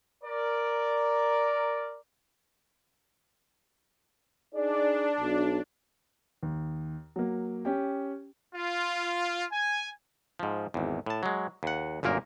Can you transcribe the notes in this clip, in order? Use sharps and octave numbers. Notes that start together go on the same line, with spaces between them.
A#4 D5
D4 D#4 G#4 D5
B1
D#2
F#3 A#3
C#4 G4 G5
F4
G#5
G#2 F3
G#1 E2
A2 A5
F#3 G#3
D#2 F#5
G1 F#2 A#2 A#3 A#4